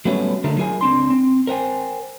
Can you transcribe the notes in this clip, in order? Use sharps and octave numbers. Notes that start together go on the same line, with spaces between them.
F#3 G3 A3 B3 C#4
D3 G#3 A3 A#4
F#3 F4 G#4 A#4 G#5
C#2 C4 D4 C6
C4
A#4 C5 G5 G#5